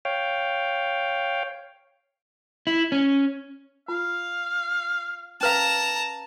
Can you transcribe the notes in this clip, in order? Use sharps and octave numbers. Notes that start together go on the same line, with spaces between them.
C#5 F5 G5
E4
C#4
F4 F5
C#4 B4 F5 A5 A#5